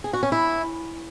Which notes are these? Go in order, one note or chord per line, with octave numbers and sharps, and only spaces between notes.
G#4
F#4
C#4
E4